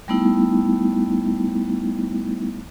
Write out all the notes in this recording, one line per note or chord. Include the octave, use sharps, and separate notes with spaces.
G3 A3 B3 D#4 E4